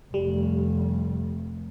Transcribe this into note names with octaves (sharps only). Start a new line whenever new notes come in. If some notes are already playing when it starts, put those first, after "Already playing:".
F1 G3